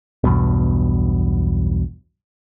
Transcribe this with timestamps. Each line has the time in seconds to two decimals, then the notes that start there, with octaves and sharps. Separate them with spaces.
0.24 B1 E2 G2 B2